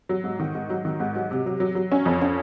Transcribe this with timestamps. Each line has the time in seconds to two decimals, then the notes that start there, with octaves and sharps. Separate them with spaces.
0.09 F#3
0.24 G#2
0.39 D#3
0.55 G#2
0.70 F#3
0.85 D#3
1.00 G#2
1.15 F#3
1.31 C3
1.46 F#3
1.60 F#3
1.75 F#3
1.92 C#4
2.06 F2
2.21 C#4